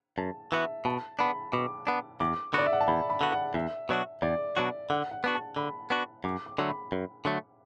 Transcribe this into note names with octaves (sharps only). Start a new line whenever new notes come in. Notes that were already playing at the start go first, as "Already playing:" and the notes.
F#2 A5
E3 B3 F#4 E5
B2 A5
B3 D4 B5
B2 D6
B3 D4
E2 D6
D3 B3 F#4 D5
E5
F#5
A5
E2 B5
B5
D3 B3 F#4
F#5
E2 E5
B2 F#3 D4 F#4
E2 D5
B2 F#3 D4 F#4
D3 F#5
F#5
B3 D4 F#4
A5
D3 B5
B3 D4 F#4
F#2 D6
D6
D3 F#3 A3
B5
F#2
D3 F#3 A3